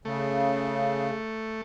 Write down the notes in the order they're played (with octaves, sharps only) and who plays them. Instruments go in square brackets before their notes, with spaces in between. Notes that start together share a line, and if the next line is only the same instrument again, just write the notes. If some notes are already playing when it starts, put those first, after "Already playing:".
[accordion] C#3 [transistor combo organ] A3